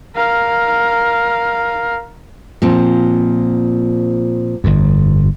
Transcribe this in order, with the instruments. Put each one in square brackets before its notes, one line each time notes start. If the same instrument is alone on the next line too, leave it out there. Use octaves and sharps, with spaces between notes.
[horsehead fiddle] A#4 F5
[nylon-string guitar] A#2 F3 C4
[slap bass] G1 F2